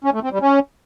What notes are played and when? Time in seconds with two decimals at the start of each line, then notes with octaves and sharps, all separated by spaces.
0.04 C#4
0.14 A3
0.23 C4
0.32 G3
0.42 C#4